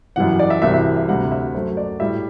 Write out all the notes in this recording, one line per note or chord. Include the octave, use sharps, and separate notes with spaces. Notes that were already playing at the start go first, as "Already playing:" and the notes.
F#2 E3 G3 F#5
D5
E5
C2 C3 E3 G3 E5
E5
E5
D2 C3 G3 F#5
E5
F#2 F#3 A3 C5
D5
A2 G3 E5